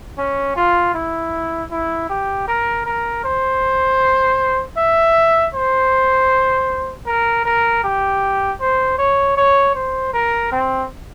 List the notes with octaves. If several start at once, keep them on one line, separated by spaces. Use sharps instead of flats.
C#4
F4
E4
E4
G4
A#4
A#4
C5
E5
C5
A#4
A#4
G4
C5
C#5
C#5
C5
A#4
C4